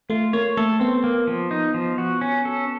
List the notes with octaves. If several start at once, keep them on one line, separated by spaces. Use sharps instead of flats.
A3 F4
A#3 C#5
A3 A4
B3 C4
A#3
F3
D#4
F3
F#4
C#4
A4